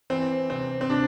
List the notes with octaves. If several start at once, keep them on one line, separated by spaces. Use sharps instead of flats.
E3 C4
C3 C4
C4
C3 D4